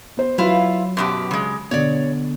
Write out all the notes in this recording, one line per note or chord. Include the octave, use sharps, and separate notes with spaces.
B3 C5
F#3 E4 F4 B4 F5
F#2 B2 G4
C#3 G#3
B2 D3 C#5 D5